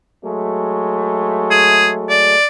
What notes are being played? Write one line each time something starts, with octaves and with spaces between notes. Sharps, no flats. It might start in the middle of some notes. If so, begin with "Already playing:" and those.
F#3 G#3 A3
G#4
D5